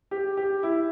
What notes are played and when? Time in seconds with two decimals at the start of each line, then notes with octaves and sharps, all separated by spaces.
0.11 G4
0.37 G4
0.63 E4